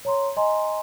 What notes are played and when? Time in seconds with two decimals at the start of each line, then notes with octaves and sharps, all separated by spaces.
0.05 C#5 A#5 C6
0.37 D#5 G#5 A#5 C6